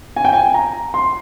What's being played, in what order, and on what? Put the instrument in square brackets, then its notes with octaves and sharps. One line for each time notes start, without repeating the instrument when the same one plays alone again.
[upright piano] G#5
G5
G#5
A#5
C6